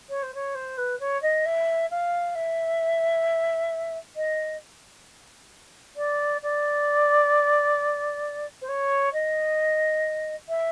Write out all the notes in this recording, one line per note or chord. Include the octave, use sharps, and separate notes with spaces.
C#5
C5
C#5
C5
B4
C#5
D#5
E5
F5
E5
D#5
D5
D5
C5
C#5
D#5
E5